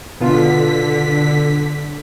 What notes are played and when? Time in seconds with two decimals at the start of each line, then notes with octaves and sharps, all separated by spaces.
0.21 B2 D3 B3 F4 B6